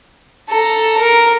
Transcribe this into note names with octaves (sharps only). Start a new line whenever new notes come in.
A4 A#5
A#4